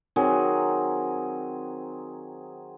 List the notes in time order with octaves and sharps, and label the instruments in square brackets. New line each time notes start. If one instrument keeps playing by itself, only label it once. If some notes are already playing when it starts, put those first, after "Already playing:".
[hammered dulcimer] D#3 F#3 C4 G#4